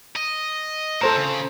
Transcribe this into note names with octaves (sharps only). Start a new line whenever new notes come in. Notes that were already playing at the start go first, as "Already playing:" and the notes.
D#5
A4 A#4 C5 E5 A#5
C#3